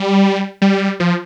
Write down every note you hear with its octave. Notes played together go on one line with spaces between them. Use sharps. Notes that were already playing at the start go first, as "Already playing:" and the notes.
Already playing: G3
G3
F3